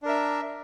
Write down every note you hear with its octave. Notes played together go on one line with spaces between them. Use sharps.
D4 A#4 E5